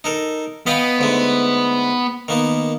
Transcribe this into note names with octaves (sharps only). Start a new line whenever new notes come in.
D#4 A4 A#4
B3 D#5 F5 G5
G#2 D3 A3
D#3 A#3 B3